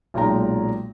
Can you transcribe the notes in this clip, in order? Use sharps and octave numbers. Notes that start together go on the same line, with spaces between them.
B1 A#2 G#3 G5 A#5